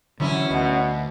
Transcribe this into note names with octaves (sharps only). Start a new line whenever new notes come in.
F#2 D3 E3 F#3 C#4 E4
D2 B2